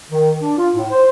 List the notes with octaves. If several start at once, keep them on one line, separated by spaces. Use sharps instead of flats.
D#3
D4
F4
A2
C5